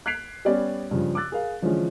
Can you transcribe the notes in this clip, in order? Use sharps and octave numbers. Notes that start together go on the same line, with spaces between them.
F#6 G#6 B6 C7 D7 F7
G3 B3 C#4 D5
G2 C#3 F3
D6 E6 F#6 A6
G#4 A#4 F5
D3 E3 F3 G#3 C#4